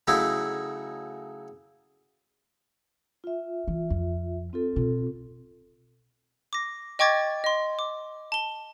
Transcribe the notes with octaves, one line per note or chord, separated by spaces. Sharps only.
C#3 F#3 A3 D#4 E4
F4 E5
E3
F2
C4 F4 A4
B2
D6 A#6
D#5 G5 C#6 D6 G#6 A6
D#5 C6
D6
A5 G7